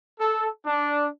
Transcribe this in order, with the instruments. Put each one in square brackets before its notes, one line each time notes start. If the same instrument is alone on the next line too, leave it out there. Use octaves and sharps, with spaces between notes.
[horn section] A4
D4